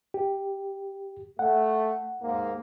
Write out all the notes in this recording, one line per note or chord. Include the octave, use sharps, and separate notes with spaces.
G4
A3 F#5
D#2 G#2 A#3